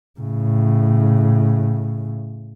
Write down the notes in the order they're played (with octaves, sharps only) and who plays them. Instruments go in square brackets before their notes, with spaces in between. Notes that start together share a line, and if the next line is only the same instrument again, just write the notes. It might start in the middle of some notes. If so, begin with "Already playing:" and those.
[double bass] A2 C#3